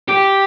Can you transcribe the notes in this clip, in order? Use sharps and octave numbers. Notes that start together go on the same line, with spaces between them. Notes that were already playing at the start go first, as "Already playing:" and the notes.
G4